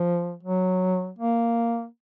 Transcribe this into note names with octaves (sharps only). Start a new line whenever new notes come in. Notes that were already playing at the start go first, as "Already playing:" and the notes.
Already playing: F3
F#3
A#3